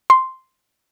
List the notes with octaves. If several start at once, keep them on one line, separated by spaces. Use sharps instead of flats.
C6